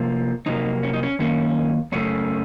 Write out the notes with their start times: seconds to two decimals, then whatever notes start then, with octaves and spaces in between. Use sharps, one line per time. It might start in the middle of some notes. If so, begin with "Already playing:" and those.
Already playing: C3 F3 A#3
0.46 F2 C3 F#3 A#3 D#4
0.83 C#4
0.93 D#4
1.03 C#4
1.19 F#2 D#3 A#3 C#4
1.92 F#2 C#3 A3 C#4